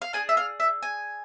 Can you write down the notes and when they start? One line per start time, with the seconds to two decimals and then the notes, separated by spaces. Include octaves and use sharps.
0.02 F5
0.13 D4 G#4 G#5
0.29 E5
0.37 F5
0.60 E5
0.83 G#5